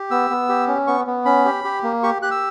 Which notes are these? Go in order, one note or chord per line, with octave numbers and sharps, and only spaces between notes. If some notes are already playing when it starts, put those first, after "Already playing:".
Already playing: G4
B3 E6
B3
G4
C#4
B3 C#6
B3
C#4 B5
G4
G4
A#3
G4 C#6
G4 F#6
E6